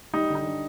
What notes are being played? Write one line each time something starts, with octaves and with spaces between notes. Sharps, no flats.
G3 D#4
D3 D#4
D3